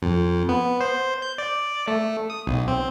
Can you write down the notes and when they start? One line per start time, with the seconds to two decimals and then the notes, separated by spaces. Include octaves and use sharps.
0.02 F2
0.49 B3
0.81 C5
1.22 G6
1.38 D5
1.88 A3
2.30 D#6
2.47 B1
2.68 C4